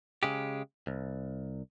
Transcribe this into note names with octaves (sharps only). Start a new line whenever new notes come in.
C#3 G#3 G4
C2